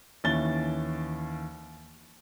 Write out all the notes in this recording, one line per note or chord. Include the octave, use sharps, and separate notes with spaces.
D#2 E3 C#4 A6 G7